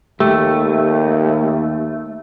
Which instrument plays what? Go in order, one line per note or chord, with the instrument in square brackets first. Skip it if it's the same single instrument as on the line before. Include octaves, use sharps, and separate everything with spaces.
[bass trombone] D#2 [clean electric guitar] A3 [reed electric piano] G4